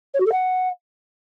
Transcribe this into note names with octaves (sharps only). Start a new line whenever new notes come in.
C#5
F#4
A4
F#5